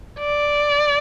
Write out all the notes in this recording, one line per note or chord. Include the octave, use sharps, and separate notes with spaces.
D5